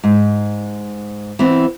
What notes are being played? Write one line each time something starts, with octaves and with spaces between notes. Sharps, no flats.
G#2
E3 B3 C4